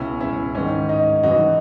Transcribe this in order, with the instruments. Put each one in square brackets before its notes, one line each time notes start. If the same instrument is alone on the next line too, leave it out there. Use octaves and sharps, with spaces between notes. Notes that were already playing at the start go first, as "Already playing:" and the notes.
Already playing: [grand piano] C#2 B2 C#4 E4
C#4 E4
G#2 D#3 C#4
D#4
F#2 C#3 E3 D#4 F#4